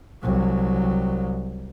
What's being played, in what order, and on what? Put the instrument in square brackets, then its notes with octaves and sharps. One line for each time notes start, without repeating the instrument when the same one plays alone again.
[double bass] C2 F#3